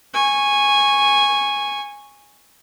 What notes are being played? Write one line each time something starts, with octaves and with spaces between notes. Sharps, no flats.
G#5 C#6